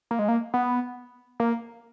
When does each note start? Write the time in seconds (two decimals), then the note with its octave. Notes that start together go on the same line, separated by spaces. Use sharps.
0.11 A#3
0.19 G#3
0.28 A#3
0.54 B3
1.40 A#3